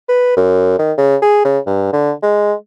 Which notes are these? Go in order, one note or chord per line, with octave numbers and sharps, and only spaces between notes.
B4
F#2
D#3
C#3
G#4
C#3
G2
D3
G#3